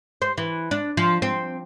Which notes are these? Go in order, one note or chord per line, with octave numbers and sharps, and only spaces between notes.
C5
E3
D4
F3
C4